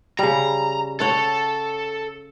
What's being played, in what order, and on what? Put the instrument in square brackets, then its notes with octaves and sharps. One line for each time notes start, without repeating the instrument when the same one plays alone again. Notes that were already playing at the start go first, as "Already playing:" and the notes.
[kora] C#3 G3 [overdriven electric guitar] A#5
[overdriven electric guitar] A4 [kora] C#5 F#5